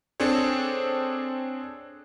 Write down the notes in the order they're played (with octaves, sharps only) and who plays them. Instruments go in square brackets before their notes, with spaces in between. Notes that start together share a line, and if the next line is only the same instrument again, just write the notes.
[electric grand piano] C4 D4 G#4 A4 C5 C#5